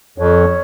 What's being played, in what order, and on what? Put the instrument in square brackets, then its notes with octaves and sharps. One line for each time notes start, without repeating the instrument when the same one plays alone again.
[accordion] F2 [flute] C#5